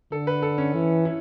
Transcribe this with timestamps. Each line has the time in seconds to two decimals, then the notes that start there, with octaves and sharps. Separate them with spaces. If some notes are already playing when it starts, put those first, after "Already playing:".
0.12 D3 A4
0.27 B4
0.42 A4
0.58 C#4
0.73 E3
1.05 E4